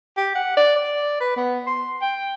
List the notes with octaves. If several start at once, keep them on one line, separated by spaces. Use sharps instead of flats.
G4
F#5
D5
D5
B4
B3
C6
G5